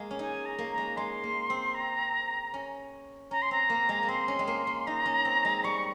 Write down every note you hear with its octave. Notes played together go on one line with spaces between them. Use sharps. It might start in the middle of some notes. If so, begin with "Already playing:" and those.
Already playing: G#3 A#3
C#4
D#4 G#5
A#5
A#3
A#5
G#3
G#3 C6
A#3
C4
A#5
C#4
C#4 A#5
C6
C4 A#5
A#3
G#3
A#3
C4 C6
C#4
G#3
A#3
C#4
D#4 A#5
C#4
C4
G#3
G3 C#6